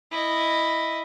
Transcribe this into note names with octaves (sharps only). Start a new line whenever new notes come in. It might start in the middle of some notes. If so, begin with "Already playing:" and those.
E4 D#5